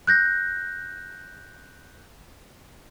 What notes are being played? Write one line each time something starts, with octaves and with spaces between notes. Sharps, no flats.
F#6 G6 A#6